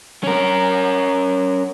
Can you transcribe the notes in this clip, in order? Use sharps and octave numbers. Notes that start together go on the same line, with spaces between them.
C#4 A#4